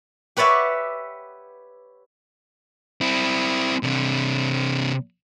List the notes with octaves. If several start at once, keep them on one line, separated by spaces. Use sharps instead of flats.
G4 B4 C#5 D5 E5 F#5
C4 E4
C3 D4